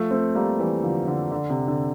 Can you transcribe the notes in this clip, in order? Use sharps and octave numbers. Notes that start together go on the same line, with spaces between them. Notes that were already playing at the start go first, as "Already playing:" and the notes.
Already playing: F3 A3
A3 C4
G3 A#3
E3 G3
D3 F3
D3
D3
C3
D3